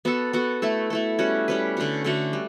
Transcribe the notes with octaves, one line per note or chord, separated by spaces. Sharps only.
B3 F#4 A4
B3 F#4 A4
A3 E4 A4
A3 E4 A4
G3 C#4 F#4 B4
G3 C#4 F#4 B4
D3 A3 C#4 F#4
D3 A3 C#4 F#4
G3